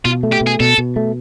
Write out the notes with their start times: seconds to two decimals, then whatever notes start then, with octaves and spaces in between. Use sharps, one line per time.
0.05 B2 F4
0.23 A3
0.32 G4
0.41 B2
0.47 G#4
0.60 B2 A4
0.78 B2
0.96 A3